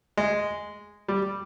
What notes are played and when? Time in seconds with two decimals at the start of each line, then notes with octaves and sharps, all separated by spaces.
0.17 G#3
1.08 G3